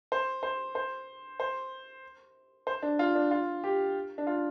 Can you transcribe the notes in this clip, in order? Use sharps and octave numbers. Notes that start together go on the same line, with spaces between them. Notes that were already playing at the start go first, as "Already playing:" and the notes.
C5
C5
C5
C5
C5
D4
F4
D4
F4
G4
D4
F4